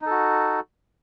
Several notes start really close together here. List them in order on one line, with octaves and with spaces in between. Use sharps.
D#4 A4 F#4